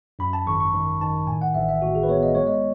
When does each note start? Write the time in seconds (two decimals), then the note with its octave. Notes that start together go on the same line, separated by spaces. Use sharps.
0.19 F#2 B5
0.33 A5
0.46 G#1 C#6
0.60 C#6
0.74 D#3
1.01 D#3 A5
1.27 A2 G#5
1.42 F#5
1.54 A1 E5
1.69 E5
1.82 A2 F#4
1.95 G#4
2.03 B4
2.09 B3 C#5
2.23 D#5
2.35 G#3 C#5
2.47 D#5